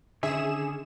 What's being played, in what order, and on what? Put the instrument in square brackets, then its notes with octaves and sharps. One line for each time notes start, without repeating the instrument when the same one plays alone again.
[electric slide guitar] D3 D#3 C#4 [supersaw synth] G#4 E7 [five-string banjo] E5